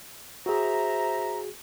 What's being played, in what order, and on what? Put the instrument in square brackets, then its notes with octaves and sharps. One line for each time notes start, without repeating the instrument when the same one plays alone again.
[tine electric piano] F#4 G#4 [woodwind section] C5 E5 A#5